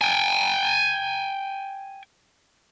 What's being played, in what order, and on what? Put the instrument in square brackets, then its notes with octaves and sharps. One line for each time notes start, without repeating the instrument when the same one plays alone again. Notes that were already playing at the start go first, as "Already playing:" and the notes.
[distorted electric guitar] G5 G#5